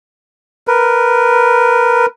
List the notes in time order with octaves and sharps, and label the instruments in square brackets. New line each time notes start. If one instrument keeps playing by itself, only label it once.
[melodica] A#4 B4